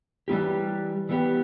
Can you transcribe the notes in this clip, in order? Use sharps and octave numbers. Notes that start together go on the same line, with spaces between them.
E3 G3 B3 E4 G4
E3 G3 B3 E4 G4